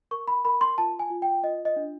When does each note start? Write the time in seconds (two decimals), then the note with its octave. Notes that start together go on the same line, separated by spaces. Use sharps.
0.11 A#4 C#6
0.28 B5
0.45 A#4 B5
0.61 C6
0.78 F4 A5
0.99 G#5
1.10 F4
1.22 G5
1.43 F4 D#5
1.65 D#5
1.76 D4